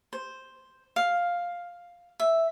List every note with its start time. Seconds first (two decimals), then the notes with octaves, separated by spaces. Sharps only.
0.13 C5
0.96 F5
2.20 E5